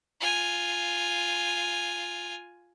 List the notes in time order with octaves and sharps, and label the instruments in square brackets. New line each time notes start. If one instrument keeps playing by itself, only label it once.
[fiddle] F4 G#5